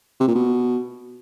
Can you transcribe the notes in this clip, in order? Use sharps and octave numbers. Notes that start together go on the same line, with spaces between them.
C3
A#2
B2